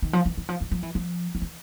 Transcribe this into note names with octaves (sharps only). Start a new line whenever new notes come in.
D#3
F3
E3
E3
F3
F3
F3
E3
F3
F3
E3